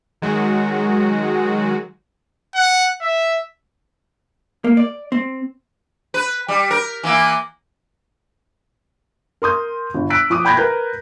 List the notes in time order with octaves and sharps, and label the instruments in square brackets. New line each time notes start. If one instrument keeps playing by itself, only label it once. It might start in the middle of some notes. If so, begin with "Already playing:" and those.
[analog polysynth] D#3 F#3 G#3 F#4
[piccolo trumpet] F#5
E5
[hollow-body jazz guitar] A#3
D5
C4
[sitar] B4
G3
A#4
E3 A#3 E4
[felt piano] A#4 C6 D#6 G6
G1
E6 F#6 B6 D7
F3 D6 D#6
G5 B5 G6 G#6 A#6
A#4 B4 A#5 G6